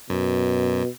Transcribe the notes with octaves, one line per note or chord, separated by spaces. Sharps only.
F#2 B2